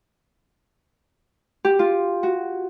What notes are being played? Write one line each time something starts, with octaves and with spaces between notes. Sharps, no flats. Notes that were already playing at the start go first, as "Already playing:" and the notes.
G4
F4
F#4